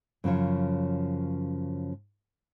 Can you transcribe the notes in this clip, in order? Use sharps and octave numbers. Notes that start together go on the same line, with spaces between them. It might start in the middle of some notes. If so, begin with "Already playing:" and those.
F#2 C#3 F3 C#5